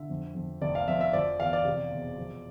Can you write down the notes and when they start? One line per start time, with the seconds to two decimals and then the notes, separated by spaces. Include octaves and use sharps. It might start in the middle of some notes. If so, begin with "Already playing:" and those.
Already playing: D3 E5
0.10 F2
0.35 F2
0.61 F1 D5
0.75 F5
0.88 F2 E5
1.01 E5
1.13 F3 D5
1.39 E2 F5
1.53 D5
1.65 C3
1.91 E1
2.17 F3